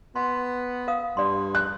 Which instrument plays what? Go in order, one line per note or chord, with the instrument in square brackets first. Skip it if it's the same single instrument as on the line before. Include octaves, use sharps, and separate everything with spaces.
[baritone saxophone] B3 [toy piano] C6
[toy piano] A#4 F5 D#6
[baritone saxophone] G2 [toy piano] D5 C6
[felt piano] F#6